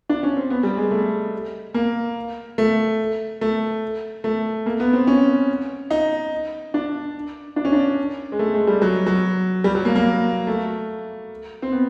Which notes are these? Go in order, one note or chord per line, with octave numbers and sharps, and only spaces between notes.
D4
C#4
C4
B3
G3
G#3
A3
A#3
A3
A3
A3
A#3
B3
C4
C#4
D#4
D4
D4
C#4
D4
G#3
A3
G#3
G3
F#3
F#3
G3
F#3
A#3
A#3
A3
C4
B3